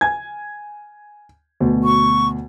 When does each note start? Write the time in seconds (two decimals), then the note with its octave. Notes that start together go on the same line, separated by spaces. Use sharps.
0.01 G#5 G#6
1.60 D2 B2
1.84 C#6